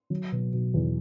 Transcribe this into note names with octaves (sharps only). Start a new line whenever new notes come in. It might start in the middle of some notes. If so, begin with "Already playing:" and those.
F#3
B2
B2
E2